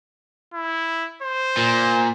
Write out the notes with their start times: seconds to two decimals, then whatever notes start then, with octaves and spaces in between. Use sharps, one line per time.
0.54 E4
1.23 C5
1.57 A#2